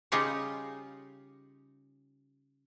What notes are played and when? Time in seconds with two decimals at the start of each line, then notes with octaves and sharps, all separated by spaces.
0.12 C#3 G3 D#4 F4 G4 C#5